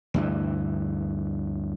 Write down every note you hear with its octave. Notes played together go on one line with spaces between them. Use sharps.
D2 G2 E3